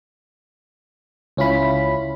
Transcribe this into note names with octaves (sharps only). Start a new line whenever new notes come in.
C#2 C#4 E4 F4 B5